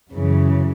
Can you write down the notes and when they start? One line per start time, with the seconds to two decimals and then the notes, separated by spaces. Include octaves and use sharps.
0.11 F#2 C#3 E3